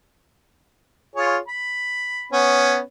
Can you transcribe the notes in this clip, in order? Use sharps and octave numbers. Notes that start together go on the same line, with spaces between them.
F4 G#4 C#5
B5
B3 C#4